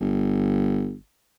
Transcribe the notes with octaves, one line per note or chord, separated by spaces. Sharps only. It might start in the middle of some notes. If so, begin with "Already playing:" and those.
G1